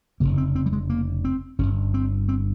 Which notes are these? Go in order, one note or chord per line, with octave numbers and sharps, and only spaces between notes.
F1 F2 C#3 A#3
C4
C4
G3
G#3
A#3
C4
G1 G2 C#4
C4
C4